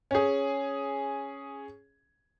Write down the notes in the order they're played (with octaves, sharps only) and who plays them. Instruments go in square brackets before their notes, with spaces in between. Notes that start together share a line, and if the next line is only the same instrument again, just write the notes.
[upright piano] C#4 G#4